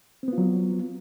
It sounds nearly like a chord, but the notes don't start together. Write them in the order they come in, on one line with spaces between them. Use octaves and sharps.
C4 B3 F4 F#3